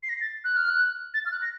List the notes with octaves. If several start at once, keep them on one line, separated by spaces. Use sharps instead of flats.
C7
A#6
A6
F#6
F6
F#6
A6
F6
F#6
A#6